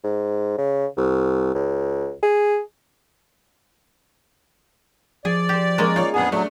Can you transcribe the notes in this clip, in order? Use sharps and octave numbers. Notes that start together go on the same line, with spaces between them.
G#2
C#3
C2
C#2
G#4
F3 G#4 D5
G4 C5
G#3 A#3 C#4 A#4
D#4 F4 C#5
F2 B3 D4 G#4 G#5
F#3 A3 D4